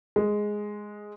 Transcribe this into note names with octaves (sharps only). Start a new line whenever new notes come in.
G#3